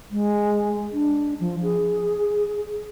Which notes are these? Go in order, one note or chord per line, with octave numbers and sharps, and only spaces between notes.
G#3
D4
F3
G#4